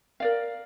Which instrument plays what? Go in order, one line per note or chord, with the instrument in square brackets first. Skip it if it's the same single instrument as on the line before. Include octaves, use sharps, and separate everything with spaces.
[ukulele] A#4 D5 F5